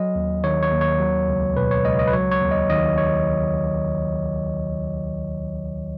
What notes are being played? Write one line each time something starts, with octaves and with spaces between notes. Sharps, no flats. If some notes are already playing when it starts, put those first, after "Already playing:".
Already playing: F#3 D#5
D#2
D#3 C#5
C#5
D#2
C#5
F#3
C#2
B2 B4
C#5
C#2 D#5
D#5
B4
F#3 C#5
C#5
D#2
D#5
D#3 D#5
C#5